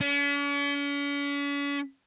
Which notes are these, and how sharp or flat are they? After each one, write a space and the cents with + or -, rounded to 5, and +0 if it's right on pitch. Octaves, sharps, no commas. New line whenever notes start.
C#4 +45